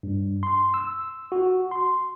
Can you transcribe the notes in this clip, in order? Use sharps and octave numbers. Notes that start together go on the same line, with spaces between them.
G2
C6
E6
F#4
C6